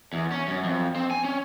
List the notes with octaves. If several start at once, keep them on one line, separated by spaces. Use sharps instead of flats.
E2
C#4
F#2
F2
C4
G#5
C#4